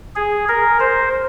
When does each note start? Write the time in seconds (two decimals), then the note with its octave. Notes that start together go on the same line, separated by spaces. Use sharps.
0.16 G#4
0.48 A#4
0.80 C5